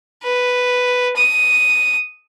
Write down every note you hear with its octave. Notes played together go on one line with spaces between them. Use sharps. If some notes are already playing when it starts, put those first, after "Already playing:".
B4
D#6